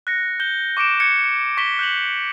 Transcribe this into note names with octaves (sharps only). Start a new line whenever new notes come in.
F#6 A#6 C#7
G6 G7
C#6 D6 C#7 D7 E7
F#6 G#6 C#7
C#6 B6 E7 G7
F#6 G6 F7 F#7